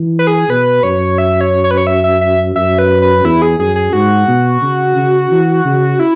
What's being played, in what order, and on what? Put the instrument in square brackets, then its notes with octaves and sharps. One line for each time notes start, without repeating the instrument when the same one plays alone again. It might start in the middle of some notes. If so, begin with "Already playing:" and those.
Already playing: [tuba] E3
[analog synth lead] B4
G#4
[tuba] B2 [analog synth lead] B4
[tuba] F#2 [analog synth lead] C#5
[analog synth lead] E5
C#5
C#5
B4
C#5
E5
E5
E5
[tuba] F#2 [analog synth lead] E5
[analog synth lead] B4
B4
[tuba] E2 [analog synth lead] E4
[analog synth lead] G#4
[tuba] F#2 [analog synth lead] G#4
[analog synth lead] G#4
[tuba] G#2 [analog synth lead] F#4
[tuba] B2
C#3
C#3
E3
C#3
[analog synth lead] E4